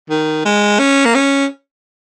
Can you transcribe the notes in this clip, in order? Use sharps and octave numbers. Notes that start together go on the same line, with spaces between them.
D#3
G#3
C#4
A#3
C#4